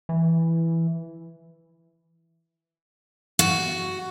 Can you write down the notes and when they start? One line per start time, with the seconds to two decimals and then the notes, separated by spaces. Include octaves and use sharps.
0.09 E3
3.39 F#4